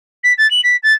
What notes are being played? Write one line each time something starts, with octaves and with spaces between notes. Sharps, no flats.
B6
A6
F#7
B6
A6